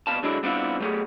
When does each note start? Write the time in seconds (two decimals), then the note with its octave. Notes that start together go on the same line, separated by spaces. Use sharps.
0.07 C2 B2 G3 B4 F5 A5
0.23 D3 F#3 G#3 D4 E4
0.43 G3 B3 C4 D4 E4 F4
0.80 F#3 A3 B3 F4 G4 G#4